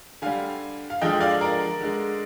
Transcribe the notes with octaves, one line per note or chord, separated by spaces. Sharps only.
D3 G3 F5 G#5
F5
D3 F3 G#3 D#5 G5
D5 F5
A#4 D5
D3 G#3